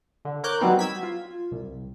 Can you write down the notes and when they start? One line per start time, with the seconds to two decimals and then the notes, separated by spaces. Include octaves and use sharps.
0.25 D3
0.44 A#4 C#5 D6 F#6 G6
0.61 F#3 G3 B3 C4 D#4 B4
0.79 E6 G#6 B6
1.03 F4
1.51 C2